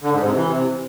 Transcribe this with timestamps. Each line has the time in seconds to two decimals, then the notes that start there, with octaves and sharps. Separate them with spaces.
0.01 D3
0.13 G#2
0.24 C3
0.36 E3
0.47 C3